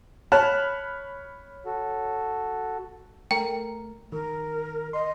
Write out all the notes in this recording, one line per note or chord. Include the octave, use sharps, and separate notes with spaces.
C#5 A5 B5 F6 F#6
F#4 A4
A3 A#4 G5
D#3 A#4
D#5 C6